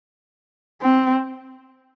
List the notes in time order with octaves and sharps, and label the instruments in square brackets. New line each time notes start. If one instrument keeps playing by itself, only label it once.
[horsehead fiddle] C4